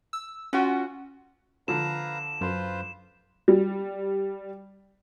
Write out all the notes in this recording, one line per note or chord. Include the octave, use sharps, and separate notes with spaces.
E6
C#4 F4 F#4 F#5
D3 F3 B4 F5 A#5 E7
F#2 F4 B4 C5
G3